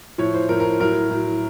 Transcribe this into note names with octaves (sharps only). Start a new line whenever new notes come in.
A2 F3 C#5
C5
A2 F3 A#4
A#4
A2 F#3 A#4
A2 F#3